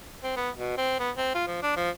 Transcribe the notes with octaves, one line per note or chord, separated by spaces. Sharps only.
C4
B3
B2
C4
B3
C4
F4
F3
D4
F3